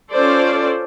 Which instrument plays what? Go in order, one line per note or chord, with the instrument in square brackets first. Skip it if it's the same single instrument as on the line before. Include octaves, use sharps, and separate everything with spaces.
[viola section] C#4 F4 A4 C5 D5